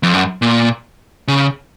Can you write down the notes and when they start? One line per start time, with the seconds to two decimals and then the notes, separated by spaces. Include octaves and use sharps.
0.03 F2
0.13 F#2
0.42 A#2
1.28 C#3